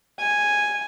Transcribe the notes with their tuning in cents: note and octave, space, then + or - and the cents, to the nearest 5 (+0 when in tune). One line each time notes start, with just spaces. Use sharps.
G#5 -5